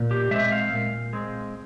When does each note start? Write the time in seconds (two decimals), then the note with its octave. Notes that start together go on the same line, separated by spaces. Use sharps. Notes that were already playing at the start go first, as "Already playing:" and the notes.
Already playing: A#2
0.11 G4
0.31 G#3 C4 E5
0.52 F5
0.73 A#2
1.13 G#3 C4